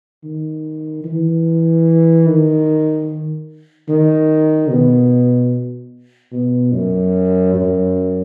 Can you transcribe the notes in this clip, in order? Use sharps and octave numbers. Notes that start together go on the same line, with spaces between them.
D#3
E3
D#3
D#3
B2
B2
F#2
F#2